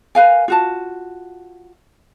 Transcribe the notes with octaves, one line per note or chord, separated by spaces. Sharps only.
A#4 B4 F5 G#5
F4 F#4 A5